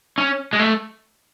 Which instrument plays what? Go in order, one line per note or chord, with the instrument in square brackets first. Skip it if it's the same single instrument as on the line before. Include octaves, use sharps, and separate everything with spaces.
[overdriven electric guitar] C#4
G#3
A3